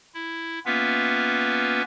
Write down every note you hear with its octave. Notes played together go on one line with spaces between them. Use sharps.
E4
A#3 B3 C#4 F4 B4 E5